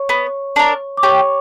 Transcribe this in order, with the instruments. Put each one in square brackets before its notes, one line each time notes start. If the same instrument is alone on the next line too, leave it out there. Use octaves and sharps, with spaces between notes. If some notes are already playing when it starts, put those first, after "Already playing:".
Already playing: [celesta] C#5 C#6
[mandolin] B3
D4 A#4
[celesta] D6
[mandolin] G4 [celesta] C#5 C#6